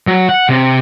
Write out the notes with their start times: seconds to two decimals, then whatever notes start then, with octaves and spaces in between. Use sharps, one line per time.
0.07 F#3
0.29 F#5
0.49 C3